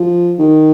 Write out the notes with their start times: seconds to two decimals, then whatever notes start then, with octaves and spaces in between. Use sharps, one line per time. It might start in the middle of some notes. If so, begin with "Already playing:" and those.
Already playing: F3
0.39 D#3